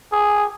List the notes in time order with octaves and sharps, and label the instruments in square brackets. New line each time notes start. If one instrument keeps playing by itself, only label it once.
[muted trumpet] G#4